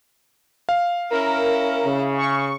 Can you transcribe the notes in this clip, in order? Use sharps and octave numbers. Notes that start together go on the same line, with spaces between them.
F5
C#4 E4 A#4
C#3
C#6